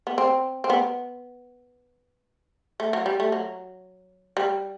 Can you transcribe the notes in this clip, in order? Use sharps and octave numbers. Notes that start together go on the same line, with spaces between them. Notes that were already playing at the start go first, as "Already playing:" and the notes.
B3
C4
C4
B3
A3
F#3
G3
A3
F#3
G3